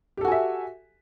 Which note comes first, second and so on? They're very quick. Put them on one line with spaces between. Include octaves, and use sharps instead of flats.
G4 A4 F#4 G#5 E5